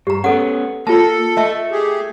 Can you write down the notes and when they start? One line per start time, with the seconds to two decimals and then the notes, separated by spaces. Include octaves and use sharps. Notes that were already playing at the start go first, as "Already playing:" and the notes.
0.07 G2 G4 A#5
0.24 B3 C#4 A4 F#5
0.87 A#3 F4 A4 A5
1.37 A3 D#5 E5 A5
1.71 G4 G#4